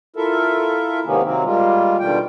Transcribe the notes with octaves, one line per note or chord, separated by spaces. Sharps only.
E4 F4 A4 A#4 E5
G#2 C3 D#3 A#3 B3 C#4
C3 D#3 F#3 A#3 C4
G3 G#3 A#3 F4
B2 D3 D#3 G3 F4 G5